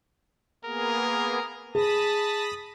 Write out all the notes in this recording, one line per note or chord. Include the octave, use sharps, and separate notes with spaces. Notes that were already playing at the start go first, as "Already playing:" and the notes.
A#3 B3 G#4 A#4
G#4 A5 B5 D#6 A#6